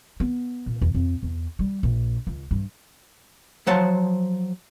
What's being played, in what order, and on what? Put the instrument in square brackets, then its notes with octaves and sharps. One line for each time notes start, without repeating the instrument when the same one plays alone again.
[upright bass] B3
A#2
E2
F2
E2
G3
A#1
C#2
G2
[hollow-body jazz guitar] F3 F#3 C5 F#5 A5